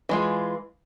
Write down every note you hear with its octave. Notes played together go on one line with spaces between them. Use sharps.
E3 G#3 F4